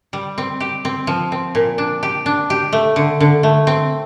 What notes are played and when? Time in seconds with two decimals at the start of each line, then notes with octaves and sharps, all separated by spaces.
0.13 G3
0.38 C4
0.60 G4
0.85 C4
1.07 F3
1.32 C4
1.55 A#2
1.78 D4
2.03 G4
2.26 D4
2.50 G4
2.73 A3
2.96 D3
3.20 D3
3.43 A3
3.67 C4